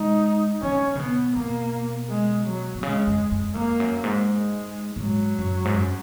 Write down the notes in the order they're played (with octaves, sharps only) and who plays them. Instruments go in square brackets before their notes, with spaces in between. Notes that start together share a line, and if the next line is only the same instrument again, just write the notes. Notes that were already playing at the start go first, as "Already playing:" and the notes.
Already playing: [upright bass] G#3 [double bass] D#4
[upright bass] F#3 [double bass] C#4
[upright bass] C#3
[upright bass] B2 [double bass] B3
[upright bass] B2 [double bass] A#3
[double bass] G#3
F#3
[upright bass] B2
[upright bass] C#3 [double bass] G#3
[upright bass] F#2
F#2
[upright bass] F2 [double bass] A#3
[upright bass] F#2
G#2
[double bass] G#3
[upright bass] A#2
[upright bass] G#2 [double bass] F#3
[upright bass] F#2
G#2
F#2